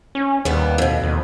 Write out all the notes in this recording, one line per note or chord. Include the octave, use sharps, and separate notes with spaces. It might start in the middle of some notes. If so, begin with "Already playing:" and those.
C#4
D#2 G3 B3
F2 B2
D#2